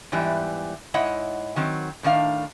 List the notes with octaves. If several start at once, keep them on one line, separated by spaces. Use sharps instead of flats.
E2 G#2 E3 G3
G#2 E4 C#5 D#5 F#5
D#3 F#3 C4
A2 D#3 D4 F5